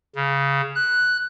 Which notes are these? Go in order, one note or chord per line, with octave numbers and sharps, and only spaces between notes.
C#3
F#6